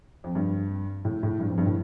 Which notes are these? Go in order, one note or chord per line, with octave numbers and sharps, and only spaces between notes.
F2
G2
A2
A2
G2
F2
G2
A2